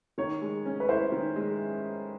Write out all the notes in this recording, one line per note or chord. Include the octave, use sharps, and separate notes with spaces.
D#3 C#5
G#3
C#4
B4
E4 C5
D#3
G#3